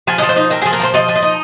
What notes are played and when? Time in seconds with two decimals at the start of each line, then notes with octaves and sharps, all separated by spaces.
0.07 F3 G#5
0.18 F3 D#5
0.29 C5
0.36 D#4
0.50 C4 A#4
0.62 F3 G#4
0.73 A#4
0.80 F3 C5
0.94 F3 D#5
1.09 F3
1.16 D#5
1.22 D#4